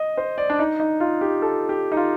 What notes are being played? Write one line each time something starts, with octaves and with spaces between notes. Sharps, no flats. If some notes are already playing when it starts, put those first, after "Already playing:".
Already playing: D#5
C5
D5
D4
D#4
D#4
F4
G4
A4
G4
D#4
F4